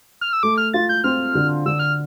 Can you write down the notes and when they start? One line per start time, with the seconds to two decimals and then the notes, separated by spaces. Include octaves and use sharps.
0.21 F6
0.33 E6
0.43 A3 D6
0.58 F6
0.74 F4 A6
0.89 G6
1.04 C4 F6
1.35 D3
1.66 D3 E6
1.79 F6